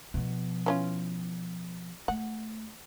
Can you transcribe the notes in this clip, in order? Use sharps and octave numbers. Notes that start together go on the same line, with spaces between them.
B2 F3
E3 C#4 F4
A3 F#5